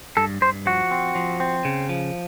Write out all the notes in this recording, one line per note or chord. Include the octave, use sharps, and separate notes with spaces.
G2 A4
G2 C5
F3 F#4
C4
F3
C4
C#3
F3